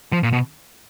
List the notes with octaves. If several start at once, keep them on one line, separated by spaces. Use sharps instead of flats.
F3
A#2
B2